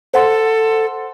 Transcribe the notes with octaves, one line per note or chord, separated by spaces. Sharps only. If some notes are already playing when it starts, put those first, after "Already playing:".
A4 C5 F#5 C6